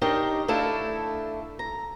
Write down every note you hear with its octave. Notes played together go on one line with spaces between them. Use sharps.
D4 D#4 G4 A#4 C#5 D#5
A3 D4 E4 A4 F5
A#5